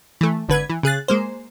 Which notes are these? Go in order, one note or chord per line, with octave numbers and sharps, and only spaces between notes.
E3 A3
G#1 D3 B4 G#6
E3
C#3 G#4 F#6 A6
G#3 A#3 C5